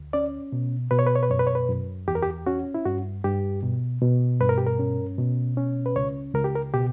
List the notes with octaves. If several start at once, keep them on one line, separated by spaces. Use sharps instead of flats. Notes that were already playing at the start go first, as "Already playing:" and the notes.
Already playing: D2
C#4 D5
B2
B2 B4
C#5
B4
C#5
B4
F#2 C#5
B4
C#5
B4
F#2
E2 G4
A#4
G4
C#4 F#4
E4
G2 F#4
G2 G4
B2
B2
G2 B4
A#4
G4
A#4
C#4
B2
C#4
B4
C#2 C#5
C#2 A#4
G4
A#4
B2 G4